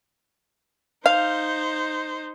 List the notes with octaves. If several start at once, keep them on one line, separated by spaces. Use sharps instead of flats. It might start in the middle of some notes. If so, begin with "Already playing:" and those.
D#4 C5 F5